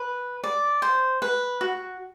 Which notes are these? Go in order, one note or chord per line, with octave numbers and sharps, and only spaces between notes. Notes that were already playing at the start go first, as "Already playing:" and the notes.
Already playing: B4
D5
C5
B4
F#4